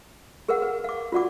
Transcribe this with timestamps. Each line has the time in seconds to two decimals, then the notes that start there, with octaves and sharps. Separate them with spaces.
0.48 G#4 A#4 B4 F5 F#5
0.62 B4
0.84 F5 D6
1.12 F4 F#4 D5 F#5 D6